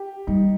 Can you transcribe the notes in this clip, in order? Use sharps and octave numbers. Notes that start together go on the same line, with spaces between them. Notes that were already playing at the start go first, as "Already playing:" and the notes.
Already playing: G4
G3 D#4